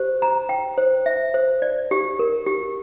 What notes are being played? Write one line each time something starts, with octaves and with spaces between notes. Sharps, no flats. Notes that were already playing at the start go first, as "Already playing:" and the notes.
Already playing: G4 C5
A#5
G5
C5
E5
C5
D5
G4
A#4
G4